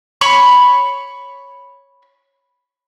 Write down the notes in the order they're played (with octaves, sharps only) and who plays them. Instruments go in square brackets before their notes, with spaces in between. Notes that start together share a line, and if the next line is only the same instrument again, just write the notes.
[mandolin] C#5 B5 C#6